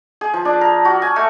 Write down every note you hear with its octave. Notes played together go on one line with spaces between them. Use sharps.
G#4
F3
D4
A#4
F#4
G#5
A3